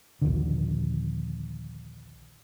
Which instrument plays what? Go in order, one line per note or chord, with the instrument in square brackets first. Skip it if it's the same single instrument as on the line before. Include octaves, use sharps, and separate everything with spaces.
[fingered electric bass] A#1 D#2 D3